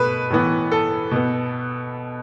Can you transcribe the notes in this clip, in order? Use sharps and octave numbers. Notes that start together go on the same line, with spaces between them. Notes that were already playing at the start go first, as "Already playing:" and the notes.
Already playing: B2 A3 B4
A2 E3 B3
A4
B2 B3